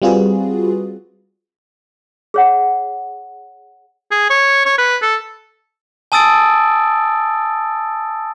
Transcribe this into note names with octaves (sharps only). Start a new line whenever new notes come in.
G3 C4 F4 F#4 G#4 B4
G#4 C#5 F#5
G#4
C#5
C#5
B4
A4
G#5 A5 D#6 E6 A6 D7